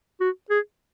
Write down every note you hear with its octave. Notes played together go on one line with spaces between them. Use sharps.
F#4
G#4